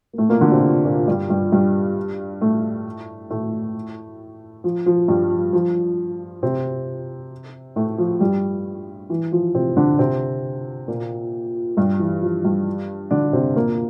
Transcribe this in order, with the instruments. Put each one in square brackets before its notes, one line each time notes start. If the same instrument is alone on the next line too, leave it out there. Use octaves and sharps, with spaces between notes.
[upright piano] A#3
A2 A3
A#2 A#3
D3 D4
C3 C4
A#2 A#3
G2 G3
G2 G3
G2 G3
A2 A3
A2 A3
F3
F3
G2 G3
F3
F3
C3 C4
A2 A3
F3
G2 G3
E3
F3
C3 C4
D3 D4
C3 C4
A#2 A#3
G2 G3
E3
F3
G2 G3
D3 D4
C3 C4
A#2 A#3